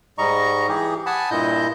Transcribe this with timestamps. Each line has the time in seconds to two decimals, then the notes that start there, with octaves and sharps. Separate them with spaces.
0.18 G#2 G3 D#5 A#5 C#6
0.69 E3 G4 G#4
1.06 F#5 G#5 A5 B5 D#6
1.31 G2 A#2 E4 D#5 G6